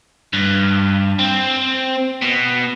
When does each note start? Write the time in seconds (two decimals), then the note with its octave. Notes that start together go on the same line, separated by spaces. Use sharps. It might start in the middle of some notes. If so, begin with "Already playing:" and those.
0.33 G2
1.19 C4
2.22 B2